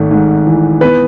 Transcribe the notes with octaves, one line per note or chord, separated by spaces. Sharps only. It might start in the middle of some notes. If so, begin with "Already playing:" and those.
Already playing: G#1 A3
G#2
E3
B3 B4